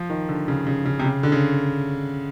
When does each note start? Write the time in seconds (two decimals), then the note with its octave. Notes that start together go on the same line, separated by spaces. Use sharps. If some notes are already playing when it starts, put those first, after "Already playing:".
Already playing: F3
0.10 D#3
0.29 D3
0.48 C#3
0.67 C#3
0.85 C#3
0.99 C3
1.04 C#3
1.23 D3
1.32 C#3